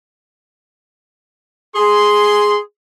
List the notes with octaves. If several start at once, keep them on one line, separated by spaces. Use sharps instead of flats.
G#4 C6